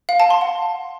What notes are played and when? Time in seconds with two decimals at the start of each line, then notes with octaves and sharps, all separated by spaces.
0.09 F5
0.20 A5
0.30 C6
0.41 F#5